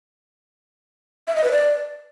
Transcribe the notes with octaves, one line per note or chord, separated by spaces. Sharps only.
E5
D#5
B4
D5